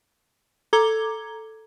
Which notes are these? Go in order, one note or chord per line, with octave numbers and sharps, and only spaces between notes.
A4 A#5 D6 G#6 G7